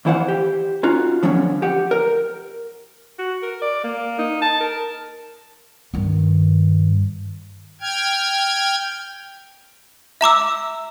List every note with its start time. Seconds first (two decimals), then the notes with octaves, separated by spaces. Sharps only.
0.05 F2 E3 E4 C5 F5 F#5
0.28 G4
0.83 C#4 D#4 F4 F#4
1.23 D3 F3 F#3 B3 C#4 C#5
1.62 G4 F#5
1.91 A#4
3.19 F#4
3.43 A#4
3.62 D5
3.84 A#3
4.18 D#4
4.42 A5
4.60 A#4
5.94 G2 D#3
7.81 G5 F6 G#6
10.21 E5 A#5 D6 E6